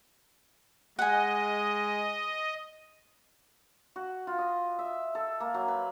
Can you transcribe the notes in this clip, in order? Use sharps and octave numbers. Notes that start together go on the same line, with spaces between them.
G#3 D#5 F#5 G#5
F#4
F4
D#5
E5
A4
A#3
F#3
B4